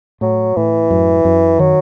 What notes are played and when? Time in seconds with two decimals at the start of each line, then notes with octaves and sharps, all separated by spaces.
0.21 A2 F#3
0.56 A2 E3
0.90 F#2
1.25 F#2
1.59 D#3 F#3